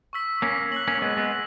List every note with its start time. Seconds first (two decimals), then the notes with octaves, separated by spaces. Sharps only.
0.13 C#6 E6 B6
0.42 A#3 C#4
0.72 F#6 B6 F#7
0.88 A#3 C#4
1.02 G#3 B3
1.17 G#3 B3